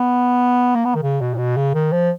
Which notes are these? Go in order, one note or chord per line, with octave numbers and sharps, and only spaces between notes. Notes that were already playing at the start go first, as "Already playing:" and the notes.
Already playing: B3
A#3
B3
D#3
C#3
B2
A#2
B2
C#3
D#3
F3